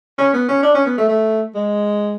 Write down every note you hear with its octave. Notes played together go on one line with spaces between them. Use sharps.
C#4
B3
C#4
D4
C#4
B3
A3
A3
G#3